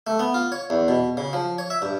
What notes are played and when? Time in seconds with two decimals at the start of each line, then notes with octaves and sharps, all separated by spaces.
0.07 A3
0.19 B3
0.34 F4
0.52 C#5
0.70 E2
0.88 B2
1.17 C#3
1.33 F3
1.58 C#5
1.70 E5
1.82 G2